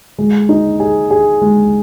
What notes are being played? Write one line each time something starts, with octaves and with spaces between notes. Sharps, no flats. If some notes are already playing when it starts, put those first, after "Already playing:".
G#3
D#4
G#4
G#4
G#3